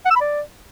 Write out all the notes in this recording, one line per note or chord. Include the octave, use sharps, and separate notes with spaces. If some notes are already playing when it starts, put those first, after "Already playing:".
F#5
E6
B5
D5